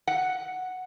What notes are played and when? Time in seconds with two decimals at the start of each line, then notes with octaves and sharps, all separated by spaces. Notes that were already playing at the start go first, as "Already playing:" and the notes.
0.07 F#5